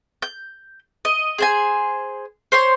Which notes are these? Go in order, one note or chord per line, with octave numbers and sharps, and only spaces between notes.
G6
D#5
G#4 C5 G#5
C5 C#5 C6